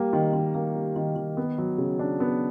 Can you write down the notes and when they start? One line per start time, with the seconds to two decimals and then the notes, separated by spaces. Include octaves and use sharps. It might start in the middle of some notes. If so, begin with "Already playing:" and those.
Already playing: G3 A#3
0.13 D#3
0.33 D#3
0.55 A#3
0.76 G3
0.96 D#3
1.16 D#3
1.37 B3
1.58 F#3
1.78 C#3
1.99 D4
2.20 B3